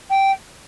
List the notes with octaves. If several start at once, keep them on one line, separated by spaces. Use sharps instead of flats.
G5